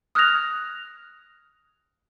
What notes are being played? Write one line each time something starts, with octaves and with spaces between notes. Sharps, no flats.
D#6 F6 F#6 G#6 A#6 F7